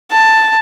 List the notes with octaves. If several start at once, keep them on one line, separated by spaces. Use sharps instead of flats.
A5